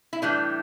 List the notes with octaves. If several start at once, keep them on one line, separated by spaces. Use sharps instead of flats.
E4
A2 E3 G3 D4